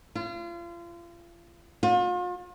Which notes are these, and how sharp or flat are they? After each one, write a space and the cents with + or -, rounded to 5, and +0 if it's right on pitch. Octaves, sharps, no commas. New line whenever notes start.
F4 -35
F4 +40